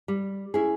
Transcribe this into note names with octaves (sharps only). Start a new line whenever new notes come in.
G3
C#4 E4 G#4